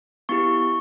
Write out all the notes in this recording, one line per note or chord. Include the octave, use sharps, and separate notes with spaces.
B3 E4 G4 C#6